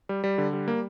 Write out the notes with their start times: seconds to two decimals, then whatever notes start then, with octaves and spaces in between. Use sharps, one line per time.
0.09 G3
0.24 G3
0.38 D3
0.53 G3
0.68 A#3